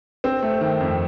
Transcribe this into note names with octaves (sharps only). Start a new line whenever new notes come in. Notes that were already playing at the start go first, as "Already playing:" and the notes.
C4
A3
D#3
F2